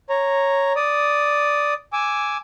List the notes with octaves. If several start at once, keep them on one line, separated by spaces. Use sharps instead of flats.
C#5 A#5
D5 D#6
G#5 D6 E6